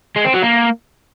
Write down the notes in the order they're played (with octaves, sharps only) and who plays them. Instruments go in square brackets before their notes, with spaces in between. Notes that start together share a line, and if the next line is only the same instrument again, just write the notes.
[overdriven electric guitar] G#3
C4
F#3
A#3